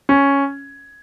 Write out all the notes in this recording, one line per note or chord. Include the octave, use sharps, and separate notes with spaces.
C#4